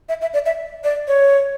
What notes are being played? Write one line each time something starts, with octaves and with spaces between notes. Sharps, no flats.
E5
E5
D5
E5
D5
C#5